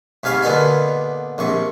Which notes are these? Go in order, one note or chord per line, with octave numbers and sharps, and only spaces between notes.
G#2 C3 F5 G#5 B5 C#6
A#2 D3 B3 D#4 G#5
A#1 C3 C#6